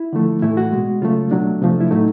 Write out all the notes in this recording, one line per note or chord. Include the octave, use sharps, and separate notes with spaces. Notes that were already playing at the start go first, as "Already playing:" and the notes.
Already playing: E4
D3 F3 A3
A2 E3 A3 E4
F#4
B2 G#3
C#3 F#3 A3 F4
B2 F#3 A3 D4
C3 F3 A3
E4
A2 F#3 A3 D#4